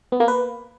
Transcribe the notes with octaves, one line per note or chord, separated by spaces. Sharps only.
B3
A#3
B4